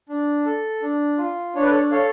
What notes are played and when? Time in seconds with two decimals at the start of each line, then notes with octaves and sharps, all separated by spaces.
0.09 D4
0.46 A4
0.82 D4
1.18 F4
1.55 D4 C#5
1.62 B4
1.69 A4 C#5
1.91 A4 C#5 F5